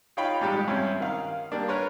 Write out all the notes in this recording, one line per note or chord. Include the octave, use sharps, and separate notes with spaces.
D#4 F4 C#5 F5 G5 B5
A1 G#2 G3 G4
G2 C4 C#4 E4
D#3 F5 F6
G3 A#3 D4
A#4 B4 C#5 C6